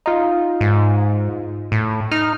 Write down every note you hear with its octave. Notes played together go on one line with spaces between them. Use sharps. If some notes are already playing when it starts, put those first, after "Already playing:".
D#4 F4
G#2
A2
D#4 F6